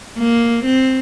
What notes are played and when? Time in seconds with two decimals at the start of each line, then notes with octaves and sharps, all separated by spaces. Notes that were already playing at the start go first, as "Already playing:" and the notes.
0.18 A#3
0.65 C4